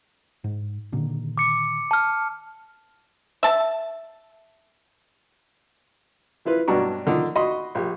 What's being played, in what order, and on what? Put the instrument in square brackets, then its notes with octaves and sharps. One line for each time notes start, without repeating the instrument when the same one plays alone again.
[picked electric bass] G#2
A#2 D3 D#3
[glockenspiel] D6 C#7
A5 F6
[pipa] E5 A5
[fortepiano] E3 E4 F4 B4
G2 B2 F#3 D4 A#5 C#6
D3 D#3 F3
F#4 D#5 B5 C6
A#1 G4